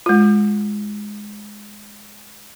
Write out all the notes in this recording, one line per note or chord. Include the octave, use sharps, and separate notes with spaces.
G#3 F4